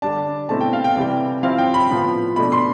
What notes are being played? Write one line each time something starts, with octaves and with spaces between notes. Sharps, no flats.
D3 G3 D4 A5
B2 A3 C4 E4 A5
G5
F5
G5
C3 E3 G3 G5
F3 C4 E4 F5
G5
B5
A2 F3 B3
B2 A3 D4 B5
C6